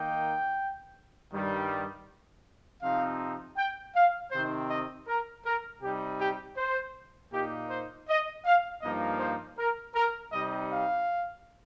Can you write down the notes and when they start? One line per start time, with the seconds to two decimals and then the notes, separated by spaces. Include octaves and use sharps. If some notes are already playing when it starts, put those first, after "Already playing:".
Already playing: D#3 A#3 D#4 G5
1.32 G2 D#3 G3
2.82 C3 F3 C4 D#4 F5
3.56 G5
3.95 F5
4.31 C3 D#3 C4 D#4 C5
4.69 D#5
5.07 A#4
5.44 A#4
5.82 C3 G3 D#4 G4
6.20 G4
6.57 C5
7.32 A#2 A#3 D#4 G4
7.70 C5
8.08 D#5
8.45 F5
8.82 G2 F3 A#3 D#4 D#5
9.20 C5
9.58 A#4
9.94 A#4
10.32 C3 G3 D#4 D#5
10.71 F5